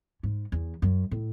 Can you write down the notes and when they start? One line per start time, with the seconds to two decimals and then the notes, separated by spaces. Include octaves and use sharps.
0.23 G#2
0.52 E2
0.82 F#2
1.11 A2